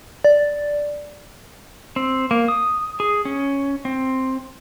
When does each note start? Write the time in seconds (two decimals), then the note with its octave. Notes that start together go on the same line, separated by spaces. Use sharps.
0.24 D5
1.96 C4
2.31 A#3
2.48 D#6
3.00 G#4
3.25 C#4
3.85 C4